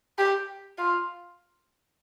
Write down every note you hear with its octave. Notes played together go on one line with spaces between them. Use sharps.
G4
F4